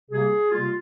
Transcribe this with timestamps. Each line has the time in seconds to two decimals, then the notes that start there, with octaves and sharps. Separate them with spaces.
0.11 C3 G3 A#3 G#4
0.51 C3 G3 A#3 F4